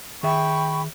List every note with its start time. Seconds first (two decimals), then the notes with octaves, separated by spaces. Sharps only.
0.23 D#3 G#4 E5 G5 B5 C#6